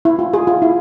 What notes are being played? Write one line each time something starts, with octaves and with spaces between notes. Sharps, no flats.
E4
F4
G#4
F4
E4